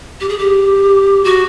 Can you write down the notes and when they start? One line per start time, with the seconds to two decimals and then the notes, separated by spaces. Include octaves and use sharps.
0.20 G4
0.29 G#4
0.39 G4
1.24 F#4